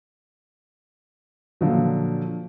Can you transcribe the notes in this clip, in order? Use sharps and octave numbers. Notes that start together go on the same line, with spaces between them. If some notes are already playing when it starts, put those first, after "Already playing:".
A#2 D3 F3 F#3